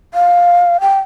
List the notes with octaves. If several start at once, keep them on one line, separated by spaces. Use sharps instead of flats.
F5
G5